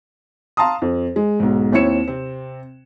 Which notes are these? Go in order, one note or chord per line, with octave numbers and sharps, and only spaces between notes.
F5 A5 A#5 C6 D#6
F2
G#3
B1 G#2
D#2 C4 E4 C#5 C#7 E7
C3 C4